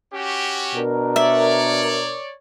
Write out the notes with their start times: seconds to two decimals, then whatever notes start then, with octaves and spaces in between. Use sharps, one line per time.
0.14 C#4 F#4 G4
0.75 B2 D4 A#4
1.16 C#5 D5 E5